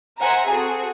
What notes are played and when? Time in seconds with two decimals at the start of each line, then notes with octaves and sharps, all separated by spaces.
0.20 A#4 C5 E5 F#5 G#5 A#5
0.49 C4 F#4 G#4 A4